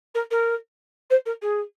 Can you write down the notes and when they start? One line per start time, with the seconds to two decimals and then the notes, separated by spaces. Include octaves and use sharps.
0.14 A#4
0.31 A#4
1.10 C5
1.25 A#4
1.42 G#4